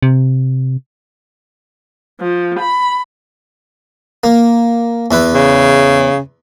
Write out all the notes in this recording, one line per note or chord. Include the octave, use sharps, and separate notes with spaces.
C3
F3
B5
A#3
E2 E4 B4
C#3